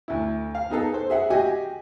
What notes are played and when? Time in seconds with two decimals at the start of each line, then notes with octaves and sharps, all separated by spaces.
0.08 D2 E4
0.55 F5
0.70 B3 D#4 G#4 A4
0.94 C5
1.10 G#4 E5 F#5
1.30 F#4 G4 D#5 G#5